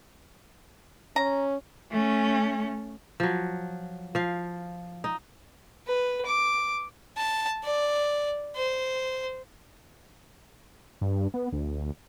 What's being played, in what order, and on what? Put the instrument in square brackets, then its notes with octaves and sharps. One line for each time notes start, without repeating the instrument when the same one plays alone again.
[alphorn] C#4 [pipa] A#5
[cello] A3 C#4
[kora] F3 F#3
F3 F5
D#4
[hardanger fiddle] B4
D6
[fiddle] A5
D5
C5
[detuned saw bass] G2
B3
D2